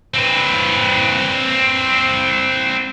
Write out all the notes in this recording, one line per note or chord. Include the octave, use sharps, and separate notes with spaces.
C4 B4